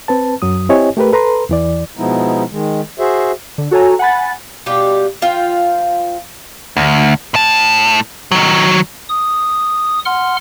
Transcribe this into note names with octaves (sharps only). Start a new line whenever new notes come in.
C4 B4 A5
F#2 F#3 D#6
C4 E4 G4 C#5 D#5 G#5
A3 G4 A#4 B4
A4 B4 A#5 C6
E2 E3 D5
B2 F3 G#3 B3 D#4 E4
D#3 G#3
F#4 G#4 C5 E5
D3
F#4 A4 C#5 G#5 A#5
F#5 G#5 B5 A6
B2 G3 F4 G4
F3 F4 F5 G5
D2
A2 A5
D#3 F#3
D#6
F#5 C6 F6